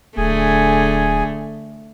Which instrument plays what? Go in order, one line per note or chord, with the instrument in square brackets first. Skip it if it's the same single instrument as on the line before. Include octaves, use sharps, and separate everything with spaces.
[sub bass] D1 [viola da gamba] D3 A3 [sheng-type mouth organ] G#4 G#5